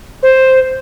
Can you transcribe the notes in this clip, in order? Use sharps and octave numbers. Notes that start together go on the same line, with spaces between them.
C5